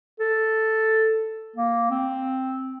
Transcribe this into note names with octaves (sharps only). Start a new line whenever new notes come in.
A4
A#3
C4